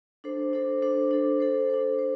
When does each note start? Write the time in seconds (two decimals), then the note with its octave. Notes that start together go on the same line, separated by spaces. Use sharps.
0.24 D4 A4 C5
0.53 D4 A4 C5
0.82 D4 A4 C5
1.11 D4 A4 C5
1.40 D4 A4 C5
1.70 D4 A4 C5
1.99 C5